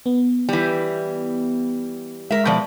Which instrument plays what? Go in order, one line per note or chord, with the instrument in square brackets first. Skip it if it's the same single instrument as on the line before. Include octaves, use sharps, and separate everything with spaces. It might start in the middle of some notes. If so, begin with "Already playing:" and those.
[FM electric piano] B3
[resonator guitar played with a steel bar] E3 G3
[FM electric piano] G#3 [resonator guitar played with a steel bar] A#4 E5
[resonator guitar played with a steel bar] B2 F3 D5